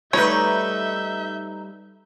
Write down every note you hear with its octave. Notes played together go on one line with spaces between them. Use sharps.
G3 A3 D#4 B4 C#5 E5 G6